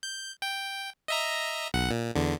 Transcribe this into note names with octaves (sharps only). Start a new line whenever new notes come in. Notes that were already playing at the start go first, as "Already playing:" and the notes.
G6
G5
D#5 E5 A#5
B1 F#5
A#2
E2 D3